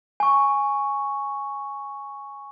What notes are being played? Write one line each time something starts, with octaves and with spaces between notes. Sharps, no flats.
G#5 C#6